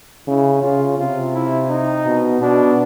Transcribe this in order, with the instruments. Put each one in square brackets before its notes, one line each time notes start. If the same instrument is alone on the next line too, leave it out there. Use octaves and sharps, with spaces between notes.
[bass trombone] C#3 [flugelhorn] E4
[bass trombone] C#3 [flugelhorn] F4
[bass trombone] C3 [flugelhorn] F4
[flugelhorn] E4
D#4
[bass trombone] B2
[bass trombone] B2 [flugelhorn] D4